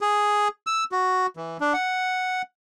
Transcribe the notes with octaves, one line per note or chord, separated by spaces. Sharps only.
G#4
E6
F#4
E3
D4
F#5